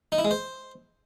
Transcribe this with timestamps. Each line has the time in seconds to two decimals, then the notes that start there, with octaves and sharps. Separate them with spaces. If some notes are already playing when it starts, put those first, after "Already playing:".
0.12 D#4
0.18 E4
0.25 G#3
0.31 C5